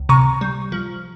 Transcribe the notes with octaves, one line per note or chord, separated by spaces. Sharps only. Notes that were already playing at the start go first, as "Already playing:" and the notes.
Already playing: C#2
C3 A#5 C#6
G3
F3